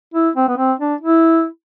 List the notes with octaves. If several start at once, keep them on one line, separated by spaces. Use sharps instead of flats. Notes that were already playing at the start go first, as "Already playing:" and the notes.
E4
C4
B3
C4
D4
E4